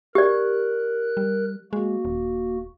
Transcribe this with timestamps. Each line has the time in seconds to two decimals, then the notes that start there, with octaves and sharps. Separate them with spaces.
0.15 G4 A#4 D5 F#6
1.17 G3
1.73 G#3 A#3 F#4
2.05 D#1